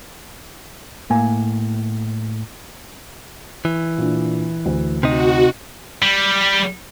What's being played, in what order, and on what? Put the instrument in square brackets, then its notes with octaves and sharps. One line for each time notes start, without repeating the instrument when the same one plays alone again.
[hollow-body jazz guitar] A2 A#3 G#5
[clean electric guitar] E3
[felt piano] A#2 D4
D2
[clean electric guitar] C3 D#4 [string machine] F#4
[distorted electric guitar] G3